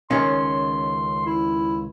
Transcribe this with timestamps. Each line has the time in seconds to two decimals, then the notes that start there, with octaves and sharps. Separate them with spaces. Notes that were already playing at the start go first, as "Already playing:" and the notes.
0.11 C#2 D#3 C#4 C6
1.26 E4